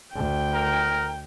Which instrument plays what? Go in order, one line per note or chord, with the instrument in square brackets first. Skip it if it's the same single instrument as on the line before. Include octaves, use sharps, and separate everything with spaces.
[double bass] D2 [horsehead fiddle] G5
[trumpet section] A#4